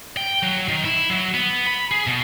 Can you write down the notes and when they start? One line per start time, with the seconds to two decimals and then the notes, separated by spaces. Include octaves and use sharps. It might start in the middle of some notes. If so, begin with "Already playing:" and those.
0.17 G5
0.43 F#3
0.68 D#3
0.85 E4
1.10 F#3
1.34 B3
1.67 B5
1.91 G#4
2.07 B2